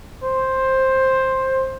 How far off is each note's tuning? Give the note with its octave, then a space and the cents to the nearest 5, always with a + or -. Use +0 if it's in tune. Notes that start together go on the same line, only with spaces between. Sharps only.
C5 +10